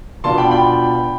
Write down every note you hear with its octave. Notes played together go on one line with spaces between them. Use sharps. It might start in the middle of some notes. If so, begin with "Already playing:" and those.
B2 B3 D4 F4 A5 C6
G5 B5
G5 B5